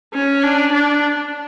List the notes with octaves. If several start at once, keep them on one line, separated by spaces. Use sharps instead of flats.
C#4
D4
D4